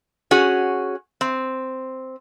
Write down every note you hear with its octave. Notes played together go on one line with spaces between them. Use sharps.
C#4 F#4 G#4
C4